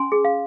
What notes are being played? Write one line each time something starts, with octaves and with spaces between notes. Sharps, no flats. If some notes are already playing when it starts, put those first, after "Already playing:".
Already playing: C#4 G#5 C6
G#4
F5